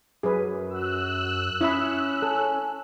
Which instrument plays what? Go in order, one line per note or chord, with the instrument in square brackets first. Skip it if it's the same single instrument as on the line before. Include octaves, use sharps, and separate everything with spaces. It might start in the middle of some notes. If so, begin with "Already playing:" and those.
[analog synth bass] F#2 [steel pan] G#4 B4
[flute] F#4 [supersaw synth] E6 F#6
[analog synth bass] C#4 [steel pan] E4 E5 B5 [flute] D#6
[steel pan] A4 [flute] G#5